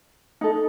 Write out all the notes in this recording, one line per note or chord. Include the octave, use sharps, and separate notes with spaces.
D#4 A4